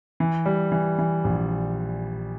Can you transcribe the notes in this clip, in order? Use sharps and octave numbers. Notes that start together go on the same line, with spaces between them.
E3
G3
E3
E3
A#1